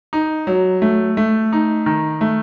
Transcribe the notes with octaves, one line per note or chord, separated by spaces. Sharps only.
D#4
F#3
A3
A3
D#4
D#3
A3